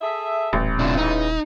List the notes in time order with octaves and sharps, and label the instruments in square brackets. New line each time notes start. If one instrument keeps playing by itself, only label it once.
[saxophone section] G#4 A4 E5
[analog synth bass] D#1 [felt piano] A1
[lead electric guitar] C3 D4 [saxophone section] E4 F4
[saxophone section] C#3 E3 [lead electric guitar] D#4